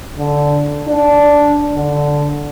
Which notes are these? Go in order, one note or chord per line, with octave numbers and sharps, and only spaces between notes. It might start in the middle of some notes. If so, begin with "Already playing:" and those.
D3
D4
D3